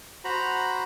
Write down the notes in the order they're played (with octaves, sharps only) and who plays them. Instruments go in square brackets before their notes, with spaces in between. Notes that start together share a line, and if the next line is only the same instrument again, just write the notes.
[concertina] F#4 C5 A#5 B5